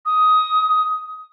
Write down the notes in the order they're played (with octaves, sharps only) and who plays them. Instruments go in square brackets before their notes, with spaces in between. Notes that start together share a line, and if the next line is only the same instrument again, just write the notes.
[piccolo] D#6